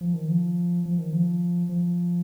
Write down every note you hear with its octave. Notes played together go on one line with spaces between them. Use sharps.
F3
D#3
F3
F3
D#3
F3
F3